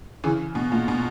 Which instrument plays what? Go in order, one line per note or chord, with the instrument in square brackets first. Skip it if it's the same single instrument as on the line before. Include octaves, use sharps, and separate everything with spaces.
[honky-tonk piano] C#3 E3
B2
A#2
B2